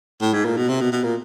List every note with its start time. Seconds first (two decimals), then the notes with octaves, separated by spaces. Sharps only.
0.21 A2
0.33 G#2
0.45 A#2
0.57 B2
0.69 C3
0.81 B2
0.92 B2
1.04 A#2